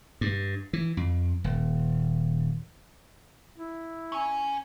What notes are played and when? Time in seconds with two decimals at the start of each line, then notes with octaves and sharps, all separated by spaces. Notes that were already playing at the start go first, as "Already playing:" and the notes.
0.21 G2
0.73 E3
0.97 F2
1.44 D#1
3.58 E4
4.12 C#4 G#5